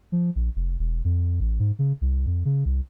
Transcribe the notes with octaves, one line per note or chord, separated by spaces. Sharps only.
F3
A#1
F1
E1
F2
A1
G#2
C#3
C2
F2
C#3
C2